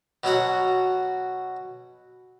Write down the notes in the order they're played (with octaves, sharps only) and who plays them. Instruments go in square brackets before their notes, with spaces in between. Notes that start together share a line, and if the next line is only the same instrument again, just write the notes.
[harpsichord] B2 F#3 F#4 F#5